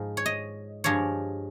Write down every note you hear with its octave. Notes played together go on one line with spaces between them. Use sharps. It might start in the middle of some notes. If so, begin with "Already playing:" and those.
Already playing: G#2 F3 G#3 F5
C#5
D#5
G2 F3 G#3 C#5